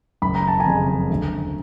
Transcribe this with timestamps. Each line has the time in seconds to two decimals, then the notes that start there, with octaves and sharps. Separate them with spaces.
0.22 F#1 B5
0.35 A#5
0.48 A5
0.60 G#5 A#5
0.66 F2 C#3
1.10 D2